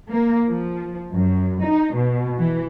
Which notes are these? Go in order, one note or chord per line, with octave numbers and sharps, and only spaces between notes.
A#3
F3
F#2
D#4
B2
E3